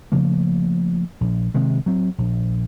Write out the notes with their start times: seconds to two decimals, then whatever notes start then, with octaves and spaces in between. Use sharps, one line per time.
0.12 C#3 F3 A3 A#3
1.21 A#1
1.54 C3 D#3 G#3
1.86 F#3 C4
2.18 A#1